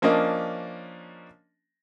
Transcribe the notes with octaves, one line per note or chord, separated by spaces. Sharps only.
F3 A#3 C#4 D4 D#5